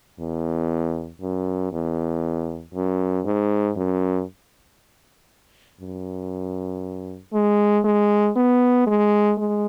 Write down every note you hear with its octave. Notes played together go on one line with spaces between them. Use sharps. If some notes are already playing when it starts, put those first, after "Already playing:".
E2
F#2
E2
F#2
G#2
F#2
F#2
G#3
G#3
B3
G#3
G#3